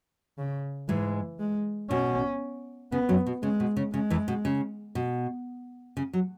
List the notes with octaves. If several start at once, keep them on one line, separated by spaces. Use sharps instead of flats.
C#3
G#2 E3 G#3
G#3
B2 C#4
C#3 B3
F#2 F#3
B2
C#3 G#3
B2
C#3
C#3 G#3
E2 E3
B2
C#3
B2
C#3
F#3